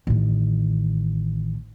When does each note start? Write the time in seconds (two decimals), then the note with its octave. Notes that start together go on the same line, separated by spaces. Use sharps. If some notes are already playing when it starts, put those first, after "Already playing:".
0.07 A1 D#3